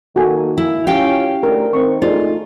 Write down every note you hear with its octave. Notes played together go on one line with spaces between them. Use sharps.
D#3 A#3 F#4 A4 G#5
E4
C#4 F4 G4 F5 G5
D2 A3 A#4
D#3 C4 C#6
A3 D4 D#4 F4 G#4 C5